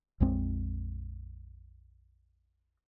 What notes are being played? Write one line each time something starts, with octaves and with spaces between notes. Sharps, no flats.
A#1 F2 G#3 C4